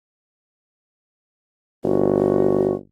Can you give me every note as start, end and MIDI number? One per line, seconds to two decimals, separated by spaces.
1.84 2.73 31
1.84 2.74 66